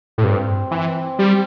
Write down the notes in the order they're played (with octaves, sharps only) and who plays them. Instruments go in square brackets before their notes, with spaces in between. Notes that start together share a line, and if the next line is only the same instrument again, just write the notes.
[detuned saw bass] A2
[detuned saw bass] G2 [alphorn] C4
[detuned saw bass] E3
G3